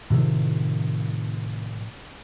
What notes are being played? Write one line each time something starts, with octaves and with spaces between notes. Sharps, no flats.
A2 C3 D#3 F3